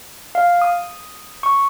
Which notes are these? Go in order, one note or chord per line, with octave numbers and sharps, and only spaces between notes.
F5
D#6
C#6